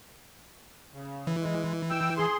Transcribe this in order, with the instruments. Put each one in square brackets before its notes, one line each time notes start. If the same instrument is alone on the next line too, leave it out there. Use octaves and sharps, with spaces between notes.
[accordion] C#3
[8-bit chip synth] E3
[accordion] G#3
G5 E6
G#4 C6